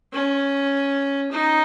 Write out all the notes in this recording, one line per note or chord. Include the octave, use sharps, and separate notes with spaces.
C#4
D#4